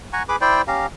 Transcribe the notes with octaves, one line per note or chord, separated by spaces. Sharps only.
F#5 G#5 A#5 C#6
G#4 B4 B5 D6
E4 C5 D5 G5
C#4 G4 F5 A#5